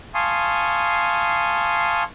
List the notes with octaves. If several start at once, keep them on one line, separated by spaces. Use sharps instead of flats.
F5 G#5 A5 C6 C#6 D#6